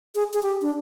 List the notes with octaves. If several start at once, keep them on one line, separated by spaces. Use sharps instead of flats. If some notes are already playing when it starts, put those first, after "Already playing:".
G#4
G#4
G4
D4